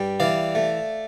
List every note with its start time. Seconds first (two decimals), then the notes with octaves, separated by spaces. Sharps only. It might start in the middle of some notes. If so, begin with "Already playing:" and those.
Already playing: G2 G3
0.20 E3 D5 F5
0.55 A3